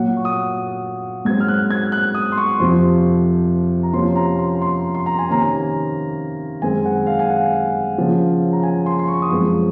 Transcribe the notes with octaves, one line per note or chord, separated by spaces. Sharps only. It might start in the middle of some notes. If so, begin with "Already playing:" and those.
Already playing: A#2 F#3 A#3 F#5
C#6
D#6
G#2 F#3 C4 G#6
F6
F#6
G#6
F#6
D#6
C6
C#6
F2 C3 F3 C6
A#5
C3 F3 A#3 C#4 C6
A#5
C6
A#5
C6
C6
A#5
G#5
C3 D#3 A#3 C#4 A#5
F#2 D#3 G#3 C4 G#5
F#5
F5
G#5
F#5
C#3 F3 A#3 C#4
A#5
G#5
C6
C6
C#6
D#6
F#2 F3 G#3 C4 C#6